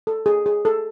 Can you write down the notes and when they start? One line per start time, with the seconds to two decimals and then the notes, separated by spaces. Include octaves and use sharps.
0.07 A4
0.26 G#4
0.46 G#4
0.65 A4